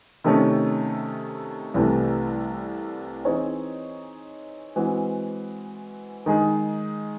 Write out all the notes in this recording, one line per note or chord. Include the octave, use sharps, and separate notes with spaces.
C3 D#3 A3 C#4
C2 C3 E3 A3
E3 C4 D#4 G#4 C#5
E3 G#3 C4 F#4
D#3 G#3 D#4 G#4